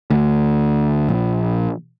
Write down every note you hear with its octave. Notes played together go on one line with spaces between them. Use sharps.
D2
A#1